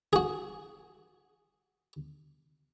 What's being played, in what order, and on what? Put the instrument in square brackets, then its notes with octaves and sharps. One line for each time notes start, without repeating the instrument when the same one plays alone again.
[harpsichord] F#4 G#4